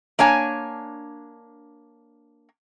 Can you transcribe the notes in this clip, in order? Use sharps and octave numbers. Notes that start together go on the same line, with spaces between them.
A#3 D4 C#5 G#5